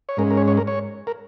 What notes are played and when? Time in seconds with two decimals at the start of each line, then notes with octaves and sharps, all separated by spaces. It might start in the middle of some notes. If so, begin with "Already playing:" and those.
0.09 C#5
0.17 G#2 G#3 C#4 A#4
0.31 A#4
0.37 C#5
0.48 C#5
0.57 A#4
0.67 C#5
1.07 A#4